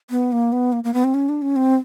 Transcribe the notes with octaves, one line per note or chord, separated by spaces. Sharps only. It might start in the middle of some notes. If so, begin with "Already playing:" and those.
B3
A#3
B3
A#3
A#3
B3
C4
C#4
D4
C#4
C4